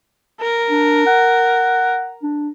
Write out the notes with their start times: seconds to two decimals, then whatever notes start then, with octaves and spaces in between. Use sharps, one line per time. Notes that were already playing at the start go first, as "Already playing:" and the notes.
0.40 A#4
0.70 D4
1.06 F#5
2.23 D4